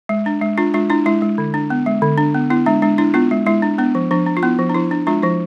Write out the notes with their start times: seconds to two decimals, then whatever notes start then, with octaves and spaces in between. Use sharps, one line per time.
0.09 G#3
0.26 D4
0.42 G#3
0.58 D4 F4
0.74 G#3 D4 F4
0.90 D4 E4
1.06 G#3 E4
1.22 G#3
1.38 D3
1.54 D4
1.70 B3
1.86 G#3
2.02 D3
2.18 D4
2.34 B3
2.50 B3 E4
2.66 G#3 D4
2.82 G#3 D4
2.98 D4 E4
3.14 B3 D4 F4
3.31 G#3
3.46 G#3 E4
3.62 D4
3.78 B3 D4
3.95 F3
4.11 F3 D4
4.27 D4
4.37 F4
4.43 B3 E4
4.59 F3
4.70 D4
4.75 F3 E4
4.91 D4
5.07 G#3 D4 F4
5.23 F3 E4